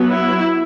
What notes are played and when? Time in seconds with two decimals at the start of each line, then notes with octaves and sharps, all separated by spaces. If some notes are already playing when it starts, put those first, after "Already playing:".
Already playing: F#3 B3
0.09 E4